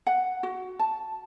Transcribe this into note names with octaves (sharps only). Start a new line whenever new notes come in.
F#5
F#4
A5